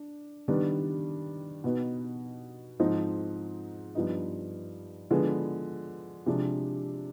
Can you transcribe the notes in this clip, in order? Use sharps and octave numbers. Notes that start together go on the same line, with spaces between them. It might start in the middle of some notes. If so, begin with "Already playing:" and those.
Already playing: D4
D#3 G3 B3 D4
B2 B3 D#4
G#2 F3 C4 D#4
G2 F3 B3 D#4
D3 F3 G#3 B3
C3 F3 G#3 D4